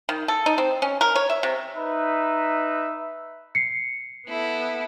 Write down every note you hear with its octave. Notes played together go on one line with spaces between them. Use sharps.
D#3
A4
D#4
C4
C#4
A#4
C#5
E5
C3
D#4 B4 E5
C7 C#7
B3 E4 A4